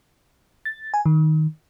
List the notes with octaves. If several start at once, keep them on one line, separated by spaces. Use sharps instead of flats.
A6
G#5
D#3